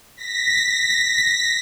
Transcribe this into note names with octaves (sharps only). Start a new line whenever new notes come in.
A#6 B6